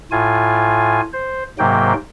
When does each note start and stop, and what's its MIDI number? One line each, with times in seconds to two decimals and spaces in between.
0.11 1.01 45
0.11 1.01 65
0.11 1.01 80
1.13 1.44 72
1.59 1.93 44
1.59 1.93 48
1.59 1.93 54
1.59 1.93 58
1.59 1.93 79